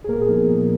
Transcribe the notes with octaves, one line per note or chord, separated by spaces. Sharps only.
G#4
A#2 A#3 A#4
G#4
F3 B3 D#4
G#4
A#2